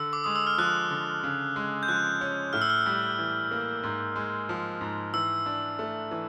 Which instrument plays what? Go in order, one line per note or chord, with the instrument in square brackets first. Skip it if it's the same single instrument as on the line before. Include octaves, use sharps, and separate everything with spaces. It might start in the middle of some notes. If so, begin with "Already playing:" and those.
Already playing: [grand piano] D3 [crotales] E6
[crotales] D6
[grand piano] G#3 [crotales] D#6
[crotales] E6
F6
[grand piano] F3 [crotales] F#6
[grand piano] D3
C#3
G#3
[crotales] G6
[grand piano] F3 [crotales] F#6
[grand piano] C#4
[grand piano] A2 [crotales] F6
[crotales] E6
F6
[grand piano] G3
E3
A#3
G#2
G#3
F3
G#2
[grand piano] E3 [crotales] E6
[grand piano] D4
A3
E3